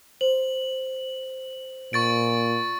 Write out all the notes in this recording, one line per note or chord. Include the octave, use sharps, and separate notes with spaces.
C5 F#7
A#2 C#6 A6 D7